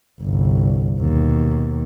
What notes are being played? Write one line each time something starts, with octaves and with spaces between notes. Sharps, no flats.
G1 C2
D#2 B2